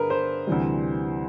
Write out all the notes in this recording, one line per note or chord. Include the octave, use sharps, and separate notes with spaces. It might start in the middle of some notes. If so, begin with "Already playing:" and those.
Already playing: G2 D3 G#4 A#4 B4
C5
D2 C3 E3 G3